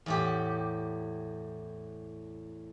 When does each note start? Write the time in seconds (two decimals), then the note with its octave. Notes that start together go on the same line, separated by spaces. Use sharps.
0.06 E2 A2 G4